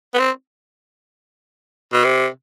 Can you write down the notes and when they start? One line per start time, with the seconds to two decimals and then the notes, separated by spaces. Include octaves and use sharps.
0.14 B3
0.19 C4
1.93 B2
2.04 C3